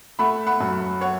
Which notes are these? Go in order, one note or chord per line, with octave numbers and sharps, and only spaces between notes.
A3 F#5 B5
F#5 B5
F#2
C#5 F#5